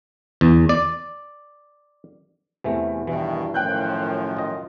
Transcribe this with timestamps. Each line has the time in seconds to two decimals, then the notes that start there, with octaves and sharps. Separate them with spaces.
0.41 E2
0.69 D5
2.64 E2 C3 E3 A3
3.07 G2 B2 D#3 E3
3.54 F#2 A2 D#3 F3 G5 F#6 G6
4.37 F4 D#5